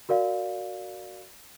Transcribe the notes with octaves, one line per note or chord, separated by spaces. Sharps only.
F#4 A#4 D5 F5